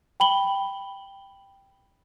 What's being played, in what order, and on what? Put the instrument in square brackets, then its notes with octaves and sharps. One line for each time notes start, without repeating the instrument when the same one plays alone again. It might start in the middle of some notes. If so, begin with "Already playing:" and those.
[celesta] G5 B5 F#7 G7